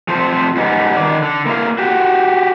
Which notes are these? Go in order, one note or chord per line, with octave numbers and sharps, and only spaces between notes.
F3 A3 C4 C5
G#2 G3 B3 C#4 D#4
D#3 D5
D3
A#3 D4 E4 F5
F#4 G4